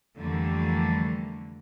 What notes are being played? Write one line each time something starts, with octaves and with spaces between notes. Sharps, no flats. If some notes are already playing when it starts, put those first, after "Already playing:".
F2 D3 E3 G3 A3 A#3